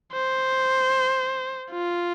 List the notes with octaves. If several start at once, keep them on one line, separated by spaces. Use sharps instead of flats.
C5
F4